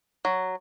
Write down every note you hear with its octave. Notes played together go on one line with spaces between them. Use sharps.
F#3